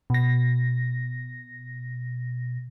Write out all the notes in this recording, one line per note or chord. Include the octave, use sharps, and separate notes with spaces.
B2 A#6